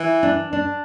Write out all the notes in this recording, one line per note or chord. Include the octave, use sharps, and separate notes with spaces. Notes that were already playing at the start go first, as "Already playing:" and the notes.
Already playing: E3
D4
D4